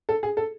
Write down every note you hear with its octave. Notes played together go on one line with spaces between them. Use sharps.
A4
G#4
A4